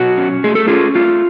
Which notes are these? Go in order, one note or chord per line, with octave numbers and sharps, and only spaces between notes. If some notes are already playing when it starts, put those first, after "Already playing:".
Already playing: B2 F#3 F#4
C#4
A3 G#4
A4
C#4 F4 G#4
A3 F4